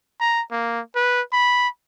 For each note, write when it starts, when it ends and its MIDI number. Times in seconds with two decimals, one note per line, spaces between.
0.20 0.41 82
0.51 0.80 58
0.95 1.21 71
1.32 1.68 83